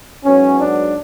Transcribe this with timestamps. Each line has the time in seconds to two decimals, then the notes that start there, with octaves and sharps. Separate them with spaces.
0.25 G#2 F#3 B3 C#4
0.60 D4